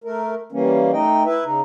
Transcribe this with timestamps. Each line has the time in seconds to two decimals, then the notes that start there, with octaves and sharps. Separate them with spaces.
0.04 A3 A#4
0.52 E3 G3 A#3 C#4
0.93 A3 D#4 D#5 G5
1.25 E4 B4 E5
1.45 C#3 D#4